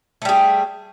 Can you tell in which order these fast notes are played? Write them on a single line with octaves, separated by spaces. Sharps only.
A3 G3 G#4